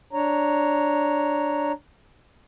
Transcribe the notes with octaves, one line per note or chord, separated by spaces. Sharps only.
D4 C#5 A#5